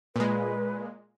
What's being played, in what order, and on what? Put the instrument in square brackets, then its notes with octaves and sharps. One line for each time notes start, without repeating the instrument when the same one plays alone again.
[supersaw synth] A#2 G#3 [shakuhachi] B4